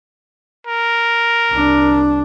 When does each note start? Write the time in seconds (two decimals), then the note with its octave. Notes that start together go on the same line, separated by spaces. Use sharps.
0.67 A#4
1.52 C2 D4